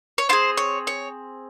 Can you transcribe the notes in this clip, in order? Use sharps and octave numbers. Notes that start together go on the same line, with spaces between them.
C#5
C4 F4 G#4 C5
C#5
C#5